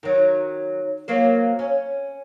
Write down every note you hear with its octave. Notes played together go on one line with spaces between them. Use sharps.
D#3 F#3
F#3 A#3 C5
C#4